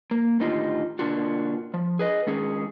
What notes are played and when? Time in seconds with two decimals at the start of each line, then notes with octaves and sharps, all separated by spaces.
0.11 A#3
0.40 A2 D3 D#3 D#4 F4 G4
0.99 B2 D3 A#3 D4 F4 F#4
1.74 F3
1.99 G#4 B4 D#5
2.27 D#3 G#3 C#4 G#4